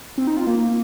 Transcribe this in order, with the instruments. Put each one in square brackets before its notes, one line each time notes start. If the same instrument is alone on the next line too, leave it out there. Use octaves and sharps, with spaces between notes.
[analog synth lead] C4
D#4
F4
A#3